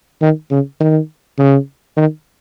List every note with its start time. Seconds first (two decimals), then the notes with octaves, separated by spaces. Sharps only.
0.22 D#3
0.51 C#3
0.80 D#3
1.38 C#3
1.97 D#3